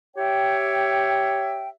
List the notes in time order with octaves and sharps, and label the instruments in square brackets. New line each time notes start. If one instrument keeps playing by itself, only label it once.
[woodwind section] G4 C#5 E5 G5